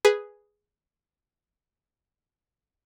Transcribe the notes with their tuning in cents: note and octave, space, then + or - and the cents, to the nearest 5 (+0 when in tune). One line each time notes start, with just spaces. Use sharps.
G#4 +0 B4 +0